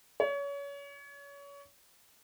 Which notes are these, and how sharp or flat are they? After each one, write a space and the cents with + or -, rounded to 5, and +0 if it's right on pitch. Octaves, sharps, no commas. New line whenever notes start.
C#5 +30